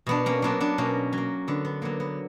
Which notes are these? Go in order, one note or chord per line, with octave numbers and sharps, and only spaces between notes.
B2 B3 D4
A#3 C#4
F#3 A#3 B3 D4
B3 D4
B2 A#3 C#4
F#3 A#3
D3 B3
B3
F#3 A#3 B3
B3